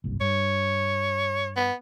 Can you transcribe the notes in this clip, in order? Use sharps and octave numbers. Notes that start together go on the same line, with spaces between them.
F#1 C2 G2
G2 C#5
B3